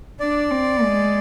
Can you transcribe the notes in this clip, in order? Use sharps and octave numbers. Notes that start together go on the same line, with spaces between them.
D4 D5
C4
G#3